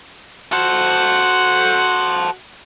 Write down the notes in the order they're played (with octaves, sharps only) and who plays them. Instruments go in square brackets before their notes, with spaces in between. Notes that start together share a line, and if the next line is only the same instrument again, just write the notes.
[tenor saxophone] F#4 [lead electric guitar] A4 C5